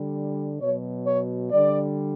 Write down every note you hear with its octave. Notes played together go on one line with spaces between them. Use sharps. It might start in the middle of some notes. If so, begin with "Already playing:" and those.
Already playing: D3 G3
B2 F#3 C#5
C#5
D3 G3 D5